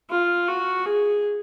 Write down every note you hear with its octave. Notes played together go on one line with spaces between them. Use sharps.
F4
F#4
G#4